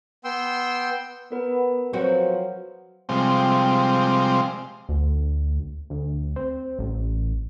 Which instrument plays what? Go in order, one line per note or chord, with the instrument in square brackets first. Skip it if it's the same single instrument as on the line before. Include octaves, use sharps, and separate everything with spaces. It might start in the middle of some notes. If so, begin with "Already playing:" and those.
[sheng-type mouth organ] B3 G5 C6 E6
[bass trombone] B3 [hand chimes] A#4 B4
[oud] F3 C4 F#4 [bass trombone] F#3
[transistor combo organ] C3 F3 G3 G#3 C4
[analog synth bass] D2
D2
C4
A1